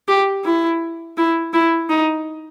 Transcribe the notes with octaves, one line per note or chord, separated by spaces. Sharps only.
G4
E4
E4
E4
D#4